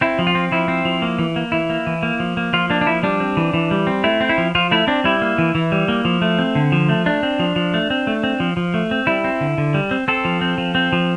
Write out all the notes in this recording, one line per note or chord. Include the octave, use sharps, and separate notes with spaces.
C4 E4
F3
F4
C4
F3 E4
C4
F3
A#3
E3
A#3
E3 E4
A#3
E3
A#3
F3
A#3
F3 F4
A#3 D4
D4
F3 E4
G3 D4
C4
E3
E3
G3
C4
A3 E4
C4
E4
F3
F3 F4
A3 E4
C4 D4
G3 E4
A#3
E3
E3
G3
A#3
F3
A3
C4
D3
F3
A3
A3 D4
C4
F3
F3
A3
C4
A3
C4
F3
F3
A3
C4
G3 E4
C4
D3
D3
G3
C4
C4 A4
F3
C4
F3
C4
F3